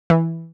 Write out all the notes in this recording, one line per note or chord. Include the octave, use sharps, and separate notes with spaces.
E3